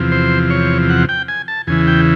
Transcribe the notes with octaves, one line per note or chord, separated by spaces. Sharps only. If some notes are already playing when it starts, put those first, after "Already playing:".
Already playing: E2 C3 F3
C5
C#5
F#5
G5
G#5
A5
E2 C#3 E3 G#5
G5